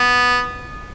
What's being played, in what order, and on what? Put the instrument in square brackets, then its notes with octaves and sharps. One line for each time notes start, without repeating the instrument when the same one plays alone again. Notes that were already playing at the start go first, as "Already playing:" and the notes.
Already playing: [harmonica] B3